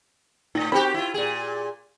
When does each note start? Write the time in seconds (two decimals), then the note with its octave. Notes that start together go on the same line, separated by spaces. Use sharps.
0.55 A2 D#4 A#6
0.72 C4 D#4 F#4 G4 A#4 B5
0.94 E4 F4
1.14 A#2 G#4